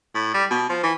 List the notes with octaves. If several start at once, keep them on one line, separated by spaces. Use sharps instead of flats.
A2
G3
B2
F3
E3